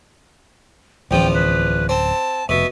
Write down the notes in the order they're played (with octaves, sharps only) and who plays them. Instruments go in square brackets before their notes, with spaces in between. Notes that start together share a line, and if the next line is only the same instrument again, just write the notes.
[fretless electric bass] D1 C#4 [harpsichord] E2 F3 [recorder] G5
[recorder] B4
[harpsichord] C4 [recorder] A5
[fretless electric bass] F1 [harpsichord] B2 [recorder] E5